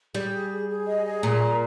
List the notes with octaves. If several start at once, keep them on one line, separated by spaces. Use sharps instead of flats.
G3 G#4
G#4
G#4
G#4
D#5
G#4
A#2 A#5
A#4